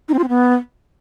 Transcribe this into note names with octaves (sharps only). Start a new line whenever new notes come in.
D#4
C4
F4
C4
B3